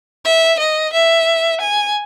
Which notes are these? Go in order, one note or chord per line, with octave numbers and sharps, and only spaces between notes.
E5
D#5
E5
G#5